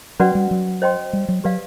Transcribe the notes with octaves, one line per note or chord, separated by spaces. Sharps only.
F#3 C#4 F#4 B4 D5 F#5
G3
F#3
C5 D#5 G5 C6
G3
F#3
F#3 G4 B4 D5 F5